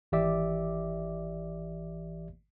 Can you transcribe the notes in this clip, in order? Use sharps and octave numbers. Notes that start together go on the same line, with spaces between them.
G#1 E3 G4 D5 E5 D6